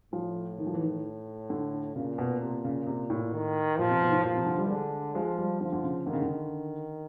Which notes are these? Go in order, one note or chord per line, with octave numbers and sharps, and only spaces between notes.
A2 F3
D#3
F3
E3
D#3
D3
A#2 C#3
B2
C3
C#3
C3
A2
D#3
A#2 F3
C3
B2
G#2
A2
A#2 F3
C3
D3
G3
D3 G#3
F3 G#3
G3
D3 F3
D3
C#3
D3 D#3
C#3
D3